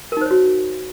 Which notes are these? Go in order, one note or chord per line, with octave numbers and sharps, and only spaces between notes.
D#4 F#4 A#4 C5 C#5